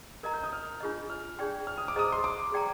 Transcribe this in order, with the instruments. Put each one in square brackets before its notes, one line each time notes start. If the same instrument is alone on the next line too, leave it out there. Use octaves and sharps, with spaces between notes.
[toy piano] A#4 D#5 A#5 [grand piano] G#6
[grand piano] G6
D#6
F6
[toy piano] D4 F4 G#4 D#5
[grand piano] F6
[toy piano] D4 G#4 D5 G5 C6
[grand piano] F6
D#6
D6
[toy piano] G#4 C5 D#5 A#5 [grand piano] D#6
[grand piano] C6
D6
[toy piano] G#4 D5 G5 A#5